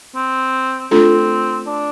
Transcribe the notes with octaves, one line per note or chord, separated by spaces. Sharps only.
C4
A3 C4 D4 F4 A4
D4